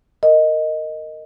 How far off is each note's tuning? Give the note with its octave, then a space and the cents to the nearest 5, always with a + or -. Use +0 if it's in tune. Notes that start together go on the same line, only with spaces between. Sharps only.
A#4 -15 D#5 +0